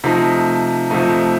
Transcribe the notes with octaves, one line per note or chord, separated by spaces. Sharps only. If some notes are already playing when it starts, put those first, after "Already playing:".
C3 F3 A3 D#4
C3 F3 A3 D#4